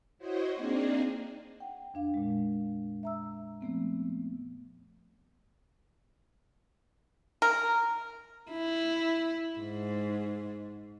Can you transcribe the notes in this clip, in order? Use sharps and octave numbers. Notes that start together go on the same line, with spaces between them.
E4 F#4 C5 C#5 D#5
A#3 C4 D4 D#4 G#4 D5
F#5 G5
F2 D4 F5
A#2 G#3
E5 A#5 E6
F3 A3 B3 C4
A#4
E4
G#2